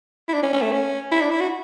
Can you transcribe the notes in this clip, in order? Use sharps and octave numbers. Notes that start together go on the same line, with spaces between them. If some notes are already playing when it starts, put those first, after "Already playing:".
E4
D4
C#4
C#4
A3
C#4
E4
D4
E4
F#4